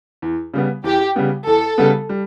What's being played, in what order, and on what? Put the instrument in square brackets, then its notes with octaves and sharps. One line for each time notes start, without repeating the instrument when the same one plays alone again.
[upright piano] E2
C#3 G3 B3
[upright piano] E2 [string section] G4
[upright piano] C#3 G3 B3
[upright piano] E2 [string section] A4
[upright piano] C#3 G3 B3
G3